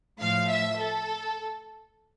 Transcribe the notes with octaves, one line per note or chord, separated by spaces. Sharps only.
A2 F3 F5
E5
A4